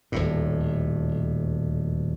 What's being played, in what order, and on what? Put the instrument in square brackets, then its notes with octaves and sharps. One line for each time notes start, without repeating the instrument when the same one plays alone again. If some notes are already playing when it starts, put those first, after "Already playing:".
[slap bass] D#1 D2 A2